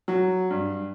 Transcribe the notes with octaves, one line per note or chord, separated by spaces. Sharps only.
F#3
G2